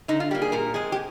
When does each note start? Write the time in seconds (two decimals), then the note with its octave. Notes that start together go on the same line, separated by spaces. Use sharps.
0.08 D3 D#4
0.20 F4
0.31 G3 A#3 G4
0.42 G#4
0.52 A#2 A#4
0.74 G#3 C4 G#4
0.92 G4